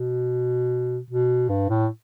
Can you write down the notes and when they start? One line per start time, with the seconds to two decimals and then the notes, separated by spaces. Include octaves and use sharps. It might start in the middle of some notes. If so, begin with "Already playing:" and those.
Already playing: B2
1.11 B2
1.49 G2
1.69 A2